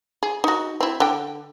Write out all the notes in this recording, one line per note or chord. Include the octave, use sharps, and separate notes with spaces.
G#4
D#4 F#4
C4 E4
D3 G5